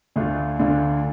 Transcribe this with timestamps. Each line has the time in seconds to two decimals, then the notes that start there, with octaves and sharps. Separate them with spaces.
0.16 D2 D3 A3 D4 F4
0.59 D2 D3 A3 D4 F4